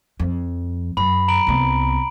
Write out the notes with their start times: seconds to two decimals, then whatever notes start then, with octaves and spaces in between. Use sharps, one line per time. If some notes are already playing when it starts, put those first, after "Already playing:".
0.19 F2
0.97 F#2 B5
1.28 A#5 D7 F#7
1.47 C2 B3